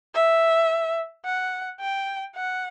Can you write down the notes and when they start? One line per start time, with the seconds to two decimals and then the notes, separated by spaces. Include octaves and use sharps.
0.15 E5
1.25 F#5
1.80 G5
2.36 F#5